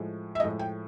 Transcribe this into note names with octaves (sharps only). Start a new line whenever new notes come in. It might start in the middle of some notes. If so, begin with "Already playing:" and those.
Already playing: A2 F3 G#3
E5
A2 F3 G#3 D#5
G5